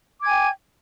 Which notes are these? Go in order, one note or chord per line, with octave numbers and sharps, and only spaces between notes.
G5 G#5 D6 G#6